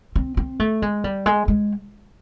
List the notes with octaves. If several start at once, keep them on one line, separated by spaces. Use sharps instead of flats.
C4
C4
A3
G#3
G3
G#3
G#3